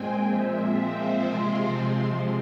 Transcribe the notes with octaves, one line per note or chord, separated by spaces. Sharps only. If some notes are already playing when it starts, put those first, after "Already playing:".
Already playing: A#2 G#3 C4 G5 G#5
A#2 F3 G#3 C4 E5
C5
C3 F3 G#3 C4